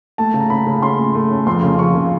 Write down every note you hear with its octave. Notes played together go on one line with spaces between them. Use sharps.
A3 A5
C#3
A#5
C#3 B5
C#3
C#4 C6
A3
A3
C#4
F2 C6
C#3
F3 C#6
C#3